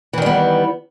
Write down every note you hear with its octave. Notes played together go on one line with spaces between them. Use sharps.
D#3 E3 G3 B3